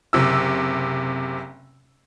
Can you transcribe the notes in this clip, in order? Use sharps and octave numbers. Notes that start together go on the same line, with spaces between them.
F#1 C3 E6